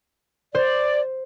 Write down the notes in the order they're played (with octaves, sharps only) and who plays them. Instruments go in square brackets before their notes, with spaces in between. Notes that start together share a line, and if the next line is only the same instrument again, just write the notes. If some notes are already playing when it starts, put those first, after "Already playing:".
[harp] C5 [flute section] D5